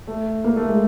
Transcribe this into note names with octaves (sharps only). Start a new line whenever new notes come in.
A3
A#3
A3
G#3